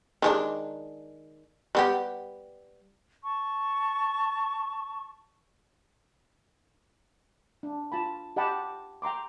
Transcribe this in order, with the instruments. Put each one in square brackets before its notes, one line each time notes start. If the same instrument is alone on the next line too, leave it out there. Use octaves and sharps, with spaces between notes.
[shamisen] D#3 G#3 D4
G3 B3 G4
[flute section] A5 C#6
[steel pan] D4
F4 A5 B5
G4 D#5 F#5 G5 A5 B5
G5 A#5 C6 D6